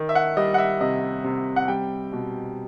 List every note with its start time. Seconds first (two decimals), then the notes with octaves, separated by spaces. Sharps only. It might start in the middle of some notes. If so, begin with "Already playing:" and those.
Already playing: D#3
0.09 E5
0.15 F#5
0.37 G3 D#5
0.54 F#5
0.58 E5
0.80 C3 D#5
1.24 C3
1.56 F#5
1.68 G3 G5
2.13 B2